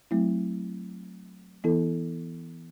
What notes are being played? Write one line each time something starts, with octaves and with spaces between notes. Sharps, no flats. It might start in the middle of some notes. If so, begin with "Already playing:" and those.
F#3 A3 C4 E4
E3 B3 E4 A4